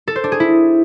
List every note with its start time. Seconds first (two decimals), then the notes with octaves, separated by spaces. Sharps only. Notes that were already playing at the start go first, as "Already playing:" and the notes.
0.08 A4
0.16 C5
0.24 D4
0.32 G#4
0.40 E4